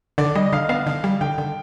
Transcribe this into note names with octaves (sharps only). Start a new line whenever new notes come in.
D3 D5
G3 D#5
D#5
D3 F5
B3 F5
D3
G3
D3 G5
D3